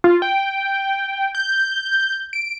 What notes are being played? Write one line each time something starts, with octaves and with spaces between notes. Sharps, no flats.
F4
G5
G6
D7